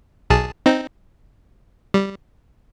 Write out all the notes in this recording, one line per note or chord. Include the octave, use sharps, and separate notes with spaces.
B1 G#4 A5
C4 D#4
G3